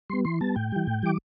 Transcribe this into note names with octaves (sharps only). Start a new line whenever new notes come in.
G3 B3 C6
E3 C6
G3 B3 A5
A2 G5
E3 G3
A2
E3 G3 D6